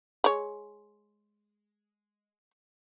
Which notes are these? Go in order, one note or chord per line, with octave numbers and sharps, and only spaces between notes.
G#3 C#5